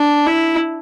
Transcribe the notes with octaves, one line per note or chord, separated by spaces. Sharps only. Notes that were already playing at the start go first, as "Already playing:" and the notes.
Already playing: D4
E4